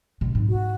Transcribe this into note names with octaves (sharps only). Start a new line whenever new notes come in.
B2
G#2
F#4